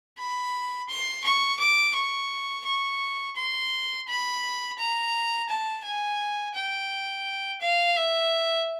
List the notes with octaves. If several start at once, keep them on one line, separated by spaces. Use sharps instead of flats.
B5
C6
C#6
D6
C#6
C#6
C6
B5
A#5
A5
G#5
G5
F5
E5